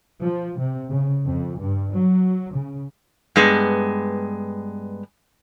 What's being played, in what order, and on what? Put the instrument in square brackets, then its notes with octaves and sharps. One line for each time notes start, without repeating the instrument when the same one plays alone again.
[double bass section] F3
C3
C#3
F2
G2
F#3
C#3
[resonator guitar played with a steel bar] G2 G#3 B3